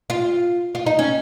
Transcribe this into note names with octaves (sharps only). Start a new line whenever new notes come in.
F4
F4
D#4
C#4